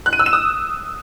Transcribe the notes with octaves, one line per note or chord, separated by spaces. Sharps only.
F#6
D#7
E6
E7
D#6